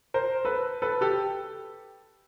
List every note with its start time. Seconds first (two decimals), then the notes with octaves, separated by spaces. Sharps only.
0.14 A#4 C5
0.45 A4 B4
0.82 A4 B4
1.01 G4 A4